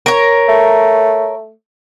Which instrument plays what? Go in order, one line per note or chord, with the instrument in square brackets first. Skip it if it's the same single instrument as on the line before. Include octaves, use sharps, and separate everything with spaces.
[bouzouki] A#4 C#5
[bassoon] A3